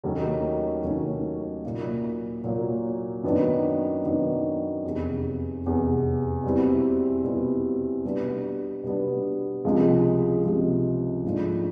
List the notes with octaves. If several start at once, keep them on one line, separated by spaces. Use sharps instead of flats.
D#2 D#3 F#3 A3 C#4
D#2 D#3 F#3 A3 C#4
A#2 F#3 A#3
A#2 F#3 A#3
F#2 D#3 F#3 B3 D4
F#2 D#3 F#3 B3 D4
F1 E2 C3
F1 E2 C3
B2 G3 C4 E4
B2 G3 C4 E4
B2 G3 B3 D4
B2 G3 B3 D4
C#2 C3 F3 G#3
C#2 C3 F3 G#3
G#2 F3 A3 D4